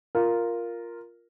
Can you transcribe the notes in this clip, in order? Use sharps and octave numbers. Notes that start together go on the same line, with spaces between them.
F4 A#4